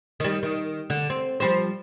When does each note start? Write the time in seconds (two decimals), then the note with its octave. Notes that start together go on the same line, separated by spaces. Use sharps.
0.20 D#3 G3
0.43 D#3
0.90 D3
1.10 C4
1.40 F3 G3 C5